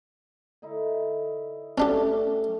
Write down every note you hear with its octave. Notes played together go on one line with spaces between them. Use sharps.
D3 D#4 E4
A3 C#4 D4 G4